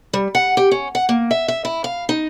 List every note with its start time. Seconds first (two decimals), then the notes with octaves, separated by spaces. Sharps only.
0.13 G3
0.35 F#5
0.57 G4
0.71 C#4
0.95 F#5
1.09 A#3
1.31 E5
1.48 E5
1.65 E4
1.84 F5
2.09 D#4